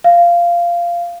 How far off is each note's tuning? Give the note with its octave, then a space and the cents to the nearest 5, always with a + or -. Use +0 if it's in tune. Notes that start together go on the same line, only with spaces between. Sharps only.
F5 -15